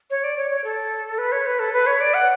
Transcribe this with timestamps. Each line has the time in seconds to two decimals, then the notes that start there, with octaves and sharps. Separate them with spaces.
0.10 C#5
0.24 D5
0.37 C#5
0.51 C#5
0.64 A4
1.18 B4
1.32 C#5
1.46 B4
1.59 A4
1.73 B4
1.87 C#5
2.01 D5
2.14 F#5